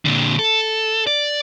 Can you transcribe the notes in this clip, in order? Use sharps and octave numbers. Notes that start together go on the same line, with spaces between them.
A#2 D3
A4
D5